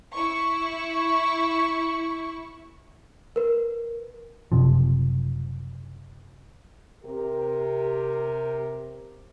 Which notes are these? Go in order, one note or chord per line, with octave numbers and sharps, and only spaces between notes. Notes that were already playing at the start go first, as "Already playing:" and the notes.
E4 C#6
A#4 B4
F#1 C3 F3
C3 G4 A#4